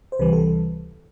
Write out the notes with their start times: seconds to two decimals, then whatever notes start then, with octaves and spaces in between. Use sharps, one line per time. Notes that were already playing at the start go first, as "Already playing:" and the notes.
0.12 C5
0.19 C#2 C3 E3 G3 B4
0.33 A4